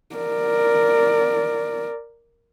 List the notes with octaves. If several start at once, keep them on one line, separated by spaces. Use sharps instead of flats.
A#4 D5